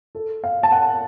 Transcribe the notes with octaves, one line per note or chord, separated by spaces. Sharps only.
A4
F5
A5
F#5